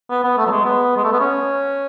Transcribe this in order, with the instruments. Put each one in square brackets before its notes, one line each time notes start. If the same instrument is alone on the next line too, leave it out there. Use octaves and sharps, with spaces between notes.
[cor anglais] B3
B3
A3
F#3
G#3
B3
G#3
A3
B3
C#4